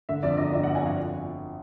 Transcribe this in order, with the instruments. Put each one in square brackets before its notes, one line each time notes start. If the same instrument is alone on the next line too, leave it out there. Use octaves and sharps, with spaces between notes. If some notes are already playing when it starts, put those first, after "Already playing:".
[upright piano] D3 [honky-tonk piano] E5
[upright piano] F2 [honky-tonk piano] D5
[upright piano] G1 [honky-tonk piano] D#5
[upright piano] G1 [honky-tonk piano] E5
[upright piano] G1 [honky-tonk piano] F#5
[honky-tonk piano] G#5
[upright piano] F2 [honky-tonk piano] F5